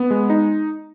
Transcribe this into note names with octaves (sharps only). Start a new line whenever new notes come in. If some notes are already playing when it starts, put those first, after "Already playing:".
Already playing: B3
G#3
D#4